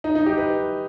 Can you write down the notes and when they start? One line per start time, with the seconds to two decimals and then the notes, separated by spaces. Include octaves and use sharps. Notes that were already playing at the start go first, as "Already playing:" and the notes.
0.04 D#4
0.15 D#4
0.26 G4
0.38 B4